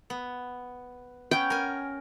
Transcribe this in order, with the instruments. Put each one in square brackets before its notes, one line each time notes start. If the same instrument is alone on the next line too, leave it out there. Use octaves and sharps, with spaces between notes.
[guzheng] B3
[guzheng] B3 C#4 [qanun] G5
[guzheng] A#4 G#5